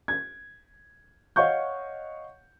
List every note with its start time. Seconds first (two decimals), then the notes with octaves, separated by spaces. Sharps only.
0.08 G#6
1.36 C#5 D#5 F5 F#5 C#6 G6